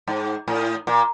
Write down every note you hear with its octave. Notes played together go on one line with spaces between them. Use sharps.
G#2
A2
A#2